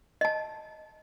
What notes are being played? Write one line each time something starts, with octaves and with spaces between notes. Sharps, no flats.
D#5 A5